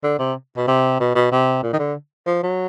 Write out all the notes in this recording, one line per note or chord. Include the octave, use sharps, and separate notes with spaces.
D3
C3
B2
C3
B2
B2
C3
A#2
D#3
D3
F3
F#3